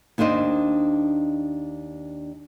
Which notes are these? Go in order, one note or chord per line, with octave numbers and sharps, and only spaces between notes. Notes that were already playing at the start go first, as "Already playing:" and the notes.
D#2 D4 D#4 C5 D#5